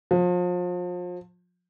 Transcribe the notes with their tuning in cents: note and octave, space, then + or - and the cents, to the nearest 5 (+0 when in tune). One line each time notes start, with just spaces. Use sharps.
F3 +35